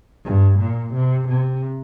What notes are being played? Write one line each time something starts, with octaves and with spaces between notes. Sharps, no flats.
G2
A#2
C3
C3